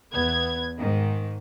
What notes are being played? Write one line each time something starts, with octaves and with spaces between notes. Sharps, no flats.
E2 B3 G#6
G#2 D#3